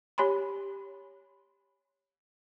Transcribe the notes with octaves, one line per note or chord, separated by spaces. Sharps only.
G4 C#5 G#5 B5 C6